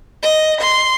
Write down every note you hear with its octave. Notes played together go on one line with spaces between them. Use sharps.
D#5
C6